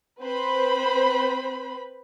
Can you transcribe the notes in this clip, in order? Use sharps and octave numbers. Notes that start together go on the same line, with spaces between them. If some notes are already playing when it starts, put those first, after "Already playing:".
C4 B4 C5 B5